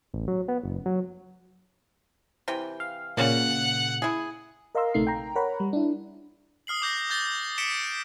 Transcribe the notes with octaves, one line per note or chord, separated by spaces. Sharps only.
A1
F#3
B3
F#1
F#3
C3 E3 G5
F5
A#2 C#3 A#3 C#4 F#5
E4 G#4
A#4 D#5 F5 A#5 C6 E6
A#1 C3 A3 D#4 C7
G5 A#5
A#4 C#5 F#5 A#5 B5
G3
D4 E4
D#6 F6 C7 F#7
D6 G6 A#6
D#6 G6 A6 G7
D#6 B6 C#7 D7 E7 G7